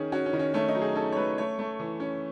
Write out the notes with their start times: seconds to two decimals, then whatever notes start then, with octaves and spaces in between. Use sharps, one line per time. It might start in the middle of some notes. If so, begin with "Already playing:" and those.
Already playing: D#3 C#4 G#4
0.12 C#4 F#4
0.26 C#4
0.33 D#3
0.39 C#4
0.54 A3 C#4
0.68 D#4
0.75 F#3
0.81 G#4
0.95 C#4 A4
1.12 C#5
1.16 A3 B4
1.38 A3 C#5
1.59 A3
1.79 E3
2.00 C#4